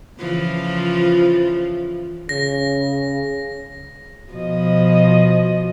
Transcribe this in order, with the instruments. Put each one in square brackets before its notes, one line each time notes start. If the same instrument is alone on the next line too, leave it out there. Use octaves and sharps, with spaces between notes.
[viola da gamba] C#3 E3 F3
[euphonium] C#3 [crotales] A#6
[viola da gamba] B2 F3 D#5